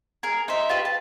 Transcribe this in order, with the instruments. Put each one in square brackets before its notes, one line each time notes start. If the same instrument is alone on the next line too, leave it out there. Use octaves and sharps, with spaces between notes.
[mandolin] G#4 A#4
D#4 C5 E5
F4 G4 B4
A5